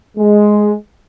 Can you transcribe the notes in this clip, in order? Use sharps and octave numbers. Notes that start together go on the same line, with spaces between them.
G#3